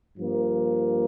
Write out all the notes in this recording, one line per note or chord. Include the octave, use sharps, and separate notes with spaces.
G2 F3 A#3